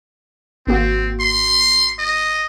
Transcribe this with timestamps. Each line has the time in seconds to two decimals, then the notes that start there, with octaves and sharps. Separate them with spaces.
0.67 G#1 A#3 C4 F#4
1.20 C6
1.99 D#5